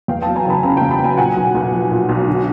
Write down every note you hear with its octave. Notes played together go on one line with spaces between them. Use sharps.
E2 F5 G5
F#3 G5 A5
G#5 A#5
F#1 A5 B5
C#3 G#5 A#5
E2 G5 A5
A5 B5
F#3 G#5 A#5
A#2 F#5 G#5
B1
B1
F3
A#2
B1
D3